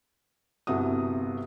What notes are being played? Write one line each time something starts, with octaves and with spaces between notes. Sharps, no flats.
G1 C2 C3 F#4 D#6